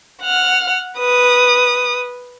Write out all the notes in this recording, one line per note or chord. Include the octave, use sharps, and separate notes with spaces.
F#5 F6
B4 D#6